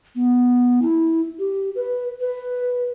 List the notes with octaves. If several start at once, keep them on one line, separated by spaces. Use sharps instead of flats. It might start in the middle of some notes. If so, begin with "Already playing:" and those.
B3
E4
G4
B4
B4